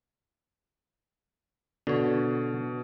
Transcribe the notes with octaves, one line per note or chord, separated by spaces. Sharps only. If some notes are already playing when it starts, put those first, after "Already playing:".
B2 D3 C#5